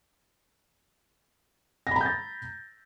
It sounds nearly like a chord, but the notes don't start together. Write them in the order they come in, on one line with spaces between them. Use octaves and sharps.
A#6 B5 A#5 G6 A6